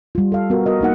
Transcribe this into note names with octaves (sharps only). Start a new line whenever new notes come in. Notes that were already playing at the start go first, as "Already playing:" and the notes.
G3 F4
A4 F5
B3 F#4 A#4
F#4 A#4 D#5
A#3 D#4 F#5